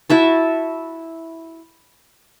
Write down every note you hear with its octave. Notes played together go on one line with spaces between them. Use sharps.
E4 F#4 E5 A5